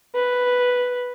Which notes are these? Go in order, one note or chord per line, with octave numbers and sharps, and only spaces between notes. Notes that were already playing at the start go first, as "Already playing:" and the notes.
B4